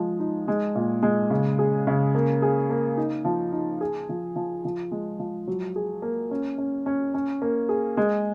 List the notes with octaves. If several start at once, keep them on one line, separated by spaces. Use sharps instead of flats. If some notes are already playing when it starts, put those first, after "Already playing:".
Already playing: F3 G#3
D#4
G#3
A#2
G#3
C#3
G#4
C#3
A#3
G#4
A#3
D#4
F3
D#4
G#4
F3
F3
F3
G#3
F3
F#3
G#4
A#3
C#4
C#4
C#4
C#4
A#3
G#4
G#3